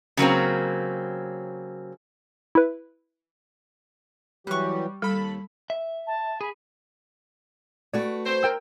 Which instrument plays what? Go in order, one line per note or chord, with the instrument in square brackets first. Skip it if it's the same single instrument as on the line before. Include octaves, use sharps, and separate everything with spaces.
[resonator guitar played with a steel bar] C#3 F#3 A#3 C4
[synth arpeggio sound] E4 B4
[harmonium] E3 F#3 G4 [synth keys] G3 [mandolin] C#6 F#6
[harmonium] D#2 [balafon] G3 [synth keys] A4 B5
[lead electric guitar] E5
[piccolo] A5
[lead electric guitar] G#4 [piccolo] B5
[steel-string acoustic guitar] A3 F#4 B4 [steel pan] D5
[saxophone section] C5
[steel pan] A#4 G5 E6